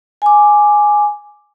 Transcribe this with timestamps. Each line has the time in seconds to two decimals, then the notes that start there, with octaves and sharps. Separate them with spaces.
0.22 G#5 D6